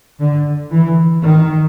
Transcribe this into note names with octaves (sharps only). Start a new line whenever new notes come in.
D3
E3
D#3